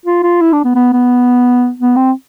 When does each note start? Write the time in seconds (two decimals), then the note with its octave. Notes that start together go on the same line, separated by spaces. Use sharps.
0.06 F4
0.23 F4
0.41 E4
0.53 D4
0.64 B3
0.75 B3
0.93 B3
1.79 B3
1.96 C4